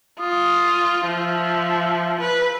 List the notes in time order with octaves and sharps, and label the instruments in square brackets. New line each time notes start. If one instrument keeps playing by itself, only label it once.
[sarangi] F4 [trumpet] D#6
[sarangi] F3 [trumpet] E5
[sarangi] B4